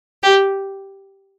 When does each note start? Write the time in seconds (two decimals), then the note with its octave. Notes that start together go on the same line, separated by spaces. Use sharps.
0.22 G4